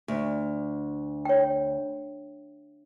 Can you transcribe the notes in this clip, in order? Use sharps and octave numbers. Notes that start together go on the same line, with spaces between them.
D2
C#5 G5